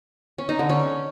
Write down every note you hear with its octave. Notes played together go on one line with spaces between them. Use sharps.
C#4
D#4
D3
C#4